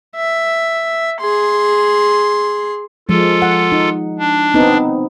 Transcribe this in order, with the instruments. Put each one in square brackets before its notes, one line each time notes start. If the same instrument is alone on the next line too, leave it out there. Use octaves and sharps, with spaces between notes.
[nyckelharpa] E5
G#4 C6
[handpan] F3 G#3 [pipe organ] F4 A4
[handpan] F#5
D#4
[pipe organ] D4
[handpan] B3 C4 D#4